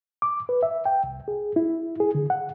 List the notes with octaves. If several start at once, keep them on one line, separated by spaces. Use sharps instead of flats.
D6
B4
E5
G5
C2
G#4
E4
G#4
D3
F#5